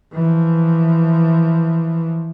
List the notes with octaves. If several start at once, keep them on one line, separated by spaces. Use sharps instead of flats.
E3 F3